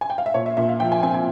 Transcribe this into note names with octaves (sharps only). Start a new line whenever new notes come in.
G#5
G5
F5
E5
A#2 C#5
E5
A#2 E5
F5
F3 G5
G#5
C4 G#5
G#5